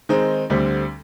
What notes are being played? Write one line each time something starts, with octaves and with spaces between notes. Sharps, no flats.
D#3 G#3 C4 D#4
D2 D3 G3 C4